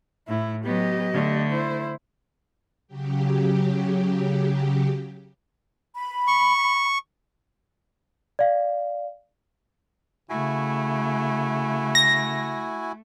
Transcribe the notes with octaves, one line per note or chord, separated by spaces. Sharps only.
A2 E4
F#3 B3 G4 D#5
D3 A3
E4 C5
C#3 F#3 G4
B5
C#6
D5 F5
C#3 A3 E4 F#4 G#5
A#6